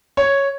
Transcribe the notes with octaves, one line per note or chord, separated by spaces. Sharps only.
C#5